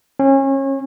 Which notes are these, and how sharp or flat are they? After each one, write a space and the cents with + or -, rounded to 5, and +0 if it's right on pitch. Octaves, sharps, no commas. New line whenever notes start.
C#4 -30